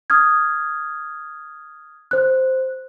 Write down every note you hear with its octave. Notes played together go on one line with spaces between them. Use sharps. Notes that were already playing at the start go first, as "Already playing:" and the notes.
D#6 F6 G#6
C5 F#6